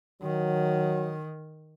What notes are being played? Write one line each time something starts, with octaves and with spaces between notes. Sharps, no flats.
D#3 F#3